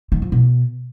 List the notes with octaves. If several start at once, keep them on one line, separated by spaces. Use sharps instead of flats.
D#3
F3
B2